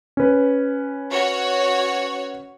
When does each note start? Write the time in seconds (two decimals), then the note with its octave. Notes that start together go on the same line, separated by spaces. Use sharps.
0.17 C#4 B4
1.11 F#4 C#5